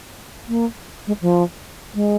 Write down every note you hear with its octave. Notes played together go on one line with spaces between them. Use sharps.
A#3
G#3
F3
G#3